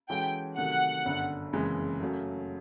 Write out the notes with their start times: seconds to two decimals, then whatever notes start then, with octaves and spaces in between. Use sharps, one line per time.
0.09 E3 G#3 C#4 F#4 A4 G5
0.58 C3 D#3 F#3 A3 F#5
1.05 G1 F#2 D3
1.53 F#1 F2 C#3 E3 G#3
2.00 F#2 C#3 F#3 A3